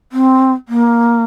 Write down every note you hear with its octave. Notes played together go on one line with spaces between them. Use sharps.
C4
A#3